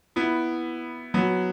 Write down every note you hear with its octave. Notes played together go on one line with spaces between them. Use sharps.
B3 E4
F#3 B3